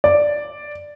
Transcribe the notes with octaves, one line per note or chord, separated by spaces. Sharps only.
D5